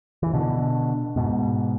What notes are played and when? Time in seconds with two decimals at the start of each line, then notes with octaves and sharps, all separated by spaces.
0.23 E3
0.34 B2 D3
1.16 G#2 B2